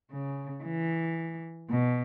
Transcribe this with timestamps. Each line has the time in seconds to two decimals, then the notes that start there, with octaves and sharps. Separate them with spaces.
0.11 C#3
0.63 E3
1.70 B2